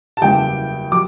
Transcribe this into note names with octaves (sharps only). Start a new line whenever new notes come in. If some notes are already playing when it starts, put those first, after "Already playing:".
A5
F#1 E2 C#3 G3 G5
F#3 D6